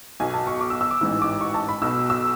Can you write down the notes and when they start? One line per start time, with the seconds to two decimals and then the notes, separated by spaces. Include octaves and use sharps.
0.20 B1 B2 G#5
0.34 A5
0.47 C#6
0.61 D6
0.70 E6
0.81 E6
0.91 D6
1.01 A1 G#2 E3 E6
1.22 D6
1.41 C#6
1.54 A5
1.69 B5
1.82 B1 B2 E6
2.10 E6